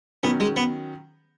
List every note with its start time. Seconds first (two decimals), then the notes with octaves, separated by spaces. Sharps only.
0.23 D#3 F#3 B3 C#4
0.40 G#3
0.56 B3